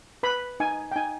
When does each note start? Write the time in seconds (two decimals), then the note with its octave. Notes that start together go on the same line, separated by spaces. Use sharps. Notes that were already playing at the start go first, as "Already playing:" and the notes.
0.23 B4 B5
0.60 D#4 G#5
0.92 G5
0.96 D#4 G#5